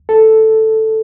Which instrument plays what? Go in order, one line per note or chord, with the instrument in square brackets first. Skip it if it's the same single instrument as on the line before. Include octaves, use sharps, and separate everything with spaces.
[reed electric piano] A4